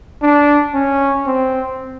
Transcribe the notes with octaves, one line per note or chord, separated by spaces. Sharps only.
D4
C#4
C4